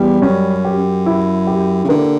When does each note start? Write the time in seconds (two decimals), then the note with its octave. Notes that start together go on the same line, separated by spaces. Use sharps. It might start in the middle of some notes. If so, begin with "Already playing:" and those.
Already playing: E2 G3
0.22 F#2 C#4
0.65 G4
1.06 E4
1.47 G4
1.85 C#3
1.89 D3 A#3